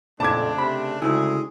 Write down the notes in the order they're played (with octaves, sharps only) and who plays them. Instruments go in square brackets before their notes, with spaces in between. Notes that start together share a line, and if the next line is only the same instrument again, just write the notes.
[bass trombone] F2 [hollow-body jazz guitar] A#2 [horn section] C#3 A3 D4 [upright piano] A5 D6 G#6
[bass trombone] C3 [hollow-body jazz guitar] B5
[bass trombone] D2 [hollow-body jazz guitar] C#3 E4 [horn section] G#3 G#4